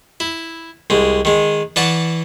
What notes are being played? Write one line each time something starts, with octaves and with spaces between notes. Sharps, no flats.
E4
C2 G#3
D#3 G#3
E3 D5 F#5 A5 C#6